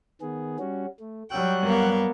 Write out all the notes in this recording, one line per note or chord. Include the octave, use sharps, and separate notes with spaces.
D#3 B3 G#4
G3 C#4 F#4
A3
F#3 G3 F#5 G5 F#6
G2 A#3 B3